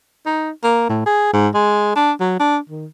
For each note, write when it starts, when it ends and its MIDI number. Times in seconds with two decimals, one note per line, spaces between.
0.26 0.50 63
0.64 0.86 58
0.89 1.01 45
1.06 1.32 68
1.33 1.48 44
1.54 1.92 56
1.96 2.12 62
2.20 2.37 54
2.40 2.58 62
2.69 2.86 51